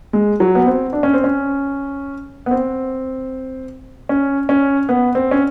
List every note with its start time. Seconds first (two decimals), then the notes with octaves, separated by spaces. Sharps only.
0.13 G#3
0.40 F#3
0.55 B3
0.66 C4
0.93 D4
1.03 C#4
1.14 C4
1.24 C#4
2.46 B3
2.51 C4
4.09 C#4
4.49 C#4
4.89 B3
5.15 C4
5.31 C#4